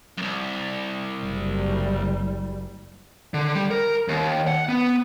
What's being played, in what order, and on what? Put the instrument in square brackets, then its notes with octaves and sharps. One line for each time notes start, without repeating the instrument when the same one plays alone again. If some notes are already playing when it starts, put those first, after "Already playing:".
[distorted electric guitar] C2 F#2
[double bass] F#1 G3
[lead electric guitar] D3
G3
A#4
D#2
F#5
B3